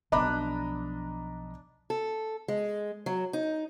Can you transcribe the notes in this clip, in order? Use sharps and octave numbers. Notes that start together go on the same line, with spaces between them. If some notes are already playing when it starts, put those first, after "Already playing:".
B1 F3 D4 D#5 A#5 B5
A4
G#3
F#3
D#4